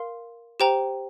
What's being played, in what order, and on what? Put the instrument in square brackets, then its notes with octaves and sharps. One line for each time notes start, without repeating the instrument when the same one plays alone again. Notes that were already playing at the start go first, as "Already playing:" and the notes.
Already playing: [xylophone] A#4 F5 C6
G4 C5 G5 A#5